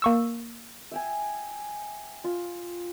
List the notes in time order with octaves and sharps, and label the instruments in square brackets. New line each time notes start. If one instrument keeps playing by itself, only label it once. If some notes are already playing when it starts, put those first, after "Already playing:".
[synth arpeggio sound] A#3 C#6 E6
[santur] E5 G5 G#5
F4